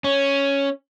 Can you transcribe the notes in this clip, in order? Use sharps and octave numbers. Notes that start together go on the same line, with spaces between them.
C#4